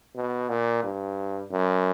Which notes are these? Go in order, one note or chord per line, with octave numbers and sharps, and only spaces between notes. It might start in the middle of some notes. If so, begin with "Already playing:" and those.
B2
A#2
G2
F#2